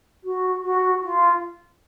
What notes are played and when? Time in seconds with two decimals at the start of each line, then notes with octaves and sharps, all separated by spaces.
0.23 F#4
0.63 F#4
1.02 F4